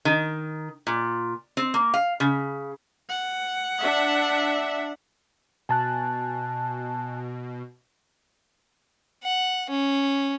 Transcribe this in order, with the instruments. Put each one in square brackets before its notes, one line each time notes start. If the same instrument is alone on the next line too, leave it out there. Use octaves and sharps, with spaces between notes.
[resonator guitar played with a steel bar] D#3
A#2
C4
A#3
F5
C#3
[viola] F#5
[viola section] D4 E5
[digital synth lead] B2 [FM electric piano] G#5 A5 F#6
[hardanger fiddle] F#5
C#4